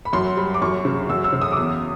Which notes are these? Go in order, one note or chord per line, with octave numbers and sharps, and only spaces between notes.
B5
F#2 C6
G3 B5
D6
F#2 C#6
C#3
F#2 E6
E6
C#3
D#6
D6
E2 D#6